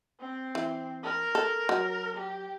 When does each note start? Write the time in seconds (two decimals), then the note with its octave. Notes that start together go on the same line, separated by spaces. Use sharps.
0.20 C4
0.55 E3
1.03 A#4
1.35 A4
1.69 F#3
2.17 G4